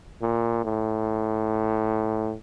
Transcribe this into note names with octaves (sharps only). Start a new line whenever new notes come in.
A#2
A2